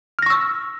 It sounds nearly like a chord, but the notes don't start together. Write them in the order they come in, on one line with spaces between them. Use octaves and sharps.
F6 A#6 C#6 E6